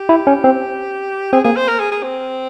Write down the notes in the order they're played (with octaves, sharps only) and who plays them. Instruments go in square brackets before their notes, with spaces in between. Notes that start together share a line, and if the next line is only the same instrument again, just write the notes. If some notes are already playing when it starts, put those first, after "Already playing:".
Already playing: [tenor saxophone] G4
[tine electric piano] E4
C#4
C4
[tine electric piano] C4 [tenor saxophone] G#4
[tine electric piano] A#3 [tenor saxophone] G#4
[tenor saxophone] C5
A#4
G#4
G#4
C4